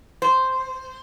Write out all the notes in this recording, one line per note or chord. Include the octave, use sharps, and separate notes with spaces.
C5